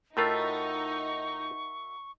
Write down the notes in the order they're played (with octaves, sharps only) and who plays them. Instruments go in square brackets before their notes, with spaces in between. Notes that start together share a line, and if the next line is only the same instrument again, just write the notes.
[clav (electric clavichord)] A2 A3 F4 [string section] D#4 [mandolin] F#4 A#4 E5 [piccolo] C#6